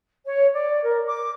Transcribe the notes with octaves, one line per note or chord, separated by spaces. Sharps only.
C#5
D5
A#4
D6